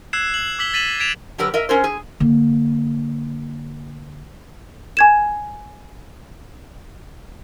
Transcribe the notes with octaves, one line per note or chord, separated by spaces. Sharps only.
E6 F#6 G#6 C7 E7
F#7
D6 E6 B6 F#7 G7
A6 B6 D#7 E7 F#7
G#6 A6 B6 D7 E7 F7
D3 F#3 G4 A#4 B4
A#4 D#5 E5
C#4 A#4 C5
G#4
D3 A#3
G#5 G#6 E7